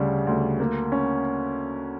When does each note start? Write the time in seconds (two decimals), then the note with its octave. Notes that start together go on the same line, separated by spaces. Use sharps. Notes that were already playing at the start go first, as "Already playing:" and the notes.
Already playing: D2 C#3 G3
0.27 D2
0.60 A#3
0.92 C#4